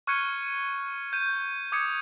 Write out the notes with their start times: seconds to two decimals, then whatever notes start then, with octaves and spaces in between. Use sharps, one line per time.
0.07 C#6 F6 F#6 G#6 C#7 D#7
1.13 G6 D#7
1.72 D6 D#6 G#6 C#7